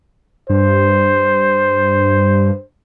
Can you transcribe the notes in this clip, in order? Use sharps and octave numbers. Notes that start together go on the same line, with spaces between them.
G2 C5